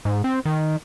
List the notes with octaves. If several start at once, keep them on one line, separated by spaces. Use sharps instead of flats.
G#2
C4
D#3